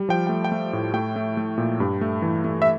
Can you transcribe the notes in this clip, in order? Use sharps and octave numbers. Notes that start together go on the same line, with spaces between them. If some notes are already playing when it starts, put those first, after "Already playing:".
Already playing: G3
F3 G5
A3 G5
G5
A3
A2
A3 G5
A3
A3
A#2
G2
A3
E3
A3
E5